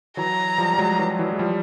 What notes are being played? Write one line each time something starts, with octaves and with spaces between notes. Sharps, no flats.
E3 F#3 A#5
F3 G3
G3
F#3 G#3
E3 F#3
E3 F#3
G#3
F3 G3